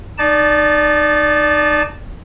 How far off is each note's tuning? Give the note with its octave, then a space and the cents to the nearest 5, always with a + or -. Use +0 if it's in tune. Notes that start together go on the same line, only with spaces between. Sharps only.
D#4 -25 D5 +0 A5 -15